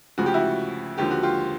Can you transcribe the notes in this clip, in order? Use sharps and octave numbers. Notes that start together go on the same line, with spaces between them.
D2 C#3 F3 F#4
G4
E4 F#4
D#2 D3 F3 G4
F#4
F4 G4